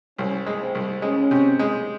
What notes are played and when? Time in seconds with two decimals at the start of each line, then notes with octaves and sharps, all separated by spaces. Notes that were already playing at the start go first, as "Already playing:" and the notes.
0.19 C2 C#4
0.46 G#3
0.61 C4
0.75 C2
1.02 G#3 C#4
1.31 C3
1.59 G#3